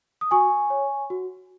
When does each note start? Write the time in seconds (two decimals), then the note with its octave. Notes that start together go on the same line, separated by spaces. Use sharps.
0.21 D#6
0.31 F#4 G#5 C#6
0.70 C#5
1.10 F#4